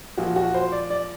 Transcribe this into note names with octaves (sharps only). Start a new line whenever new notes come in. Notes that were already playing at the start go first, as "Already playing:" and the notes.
A#2 F3 F#4
F#4
C5
D5
D5